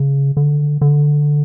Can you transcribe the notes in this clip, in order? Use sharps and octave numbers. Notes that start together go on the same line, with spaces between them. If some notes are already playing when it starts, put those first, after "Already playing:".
Already playing: C#3
D3
D3